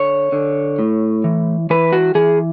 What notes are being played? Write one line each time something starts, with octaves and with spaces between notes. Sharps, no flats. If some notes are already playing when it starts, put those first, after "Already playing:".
Already playing: D3 C#5
D3
A2
E3
E3 B4
F#4
E3 G#4